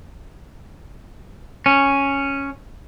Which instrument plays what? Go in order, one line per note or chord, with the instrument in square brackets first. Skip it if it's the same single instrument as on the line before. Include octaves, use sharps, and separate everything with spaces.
[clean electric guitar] C#4